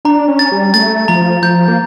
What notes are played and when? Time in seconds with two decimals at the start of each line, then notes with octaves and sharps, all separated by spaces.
0.05 D4 A#5
0.28 C#4
0.39 A6
0.52 G3
0.74 A3 A6
1.08 F3 A#5
1.42 F3 G6
1.68 A#3